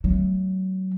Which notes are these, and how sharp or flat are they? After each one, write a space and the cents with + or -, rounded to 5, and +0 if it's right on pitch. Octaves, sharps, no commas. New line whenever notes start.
F#3 +25 A3 +0